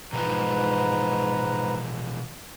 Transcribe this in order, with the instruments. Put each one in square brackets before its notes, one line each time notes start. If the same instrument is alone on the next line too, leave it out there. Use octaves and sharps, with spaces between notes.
[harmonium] G#2 B4 A#5 [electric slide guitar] B2 E3 F3